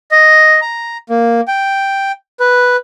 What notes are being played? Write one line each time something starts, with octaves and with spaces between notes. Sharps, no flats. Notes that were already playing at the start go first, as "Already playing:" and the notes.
D#5
A#5
A#3
G5
B4